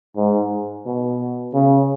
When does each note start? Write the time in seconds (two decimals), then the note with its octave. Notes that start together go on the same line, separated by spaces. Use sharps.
0.17 G#2
0.86 B2
1.54 C#3